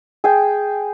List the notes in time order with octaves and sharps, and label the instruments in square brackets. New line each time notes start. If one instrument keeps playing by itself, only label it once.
[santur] G#4 G5